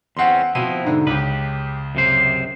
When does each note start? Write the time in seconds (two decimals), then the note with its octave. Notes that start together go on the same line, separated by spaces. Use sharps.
0.17 E2 C4 C#4 F#5 C6
0.55 B2 F3 C4 E4 D#7
0.85 G#2 D3
1.07 C#2 G4 B4
1.95 F#2 C3 C5